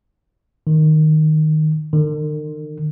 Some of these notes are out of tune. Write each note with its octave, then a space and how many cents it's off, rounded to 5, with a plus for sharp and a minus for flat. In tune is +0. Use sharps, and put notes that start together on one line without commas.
D#3 -5
D#3 -45